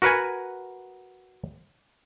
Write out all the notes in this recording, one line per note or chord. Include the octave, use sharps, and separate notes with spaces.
F#4 A#4 B4 F#5 G#5